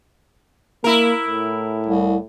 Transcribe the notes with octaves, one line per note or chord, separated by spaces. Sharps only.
A#3 E4 A#4
A2
C2